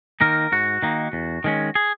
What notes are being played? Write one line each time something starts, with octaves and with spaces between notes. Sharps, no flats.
D#3 A#3 D#4 A#4
G#2 F#4
D#3 A#3 D#4
E2
D#3 G#3 C#4
G#4